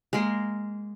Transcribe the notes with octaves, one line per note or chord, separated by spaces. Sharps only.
G#3 A#3 A#4 C6